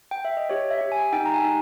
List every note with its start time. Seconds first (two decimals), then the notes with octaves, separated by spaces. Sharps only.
0.11 G5
0.25 E5
0.37 D#5
0.49 G4 C#5
0.71 E5
0.81 G4
0.92 G#5
1.13 D#4 G5
1.26 A#5
1.34 G#5
1.44 D#4